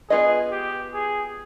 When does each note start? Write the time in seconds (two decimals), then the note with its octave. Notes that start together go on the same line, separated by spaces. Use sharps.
0.10 B3 F4 G#4 B4 D#5
0.51 G4
0.94 G#4